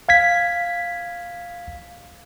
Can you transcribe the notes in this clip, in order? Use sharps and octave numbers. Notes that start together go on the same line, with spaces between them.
F5 G#6 B6